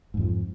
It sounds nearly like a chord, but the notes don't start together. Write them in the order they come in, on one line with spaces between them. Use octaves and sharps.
G#2 F2 F3